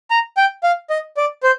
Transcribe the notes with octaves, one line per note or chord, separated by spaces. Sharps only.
A#5
G5
F5
D#5
D5
C5